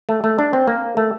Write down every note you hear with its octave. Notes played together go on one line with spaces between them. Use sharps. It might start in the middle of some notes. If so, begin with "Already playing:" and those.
A3
A3
D4
C4
A#3
A3